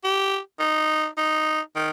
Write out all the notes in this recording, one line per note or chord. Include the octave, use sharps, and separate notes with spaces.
G4
D#4
D#4
D#3